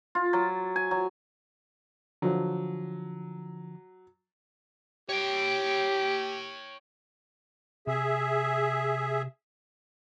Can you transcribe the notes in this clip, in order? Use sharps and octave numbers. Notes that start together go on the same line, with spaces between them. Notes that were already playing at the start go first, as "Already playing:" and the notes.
F4
F#3
G#5
F#3
D3 F3 F#3
G4 C#5 G5
C3 G#4 E5